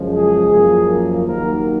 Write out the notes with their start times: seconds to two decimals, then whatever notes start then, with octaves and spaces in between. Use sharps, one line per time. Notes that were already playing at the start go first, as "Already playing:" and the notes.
Already playing: F#2 C#3 F3 G#3
0.13 G#4
0.50 F#2 F3 A#3
1.26 D#2 D#3 F#3 A#3 A#4